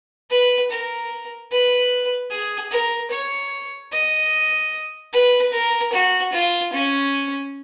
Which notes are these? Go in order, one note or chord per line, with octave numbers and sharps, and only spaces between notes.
B4
A#4
B4
G#4
A#4
C#5
D#5
B4
A#4
F#4
F4
C#4